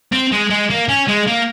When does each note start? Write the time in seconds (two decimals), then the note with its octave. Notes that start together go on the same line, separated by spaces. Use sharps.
0.12 C4
0.32 G#3
0.50 G#3
0.70 A#3
0.89 C#4
1.08 G#3
1.28 A#3